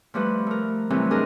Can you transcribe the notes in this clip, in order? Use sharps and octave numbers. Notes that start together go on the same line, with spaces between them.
F3 G3 A3 B4 B5
A3 A#4
C3 E3 F#3 G3 A3 C4
D4 G#4 A#4 D#5